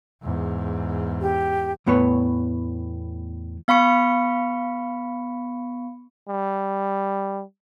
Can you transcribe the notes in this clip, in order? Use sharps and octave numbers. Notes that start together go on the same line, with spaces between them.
E2 G#2
G4
E2 A2 B3 B4 C#5
B3 F5 B5 C#6 C#7
G3